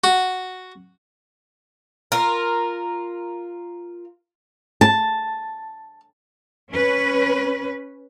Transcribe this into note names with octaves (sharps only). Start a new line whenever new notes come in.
F#4
F4 A#4
A5
C#4 B4